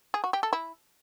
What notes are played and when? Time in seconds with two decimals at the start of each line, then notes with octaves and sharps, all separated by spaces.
0.14 G#4
0.24 F#4
0.33 G4
0.43 A4
0.53 E4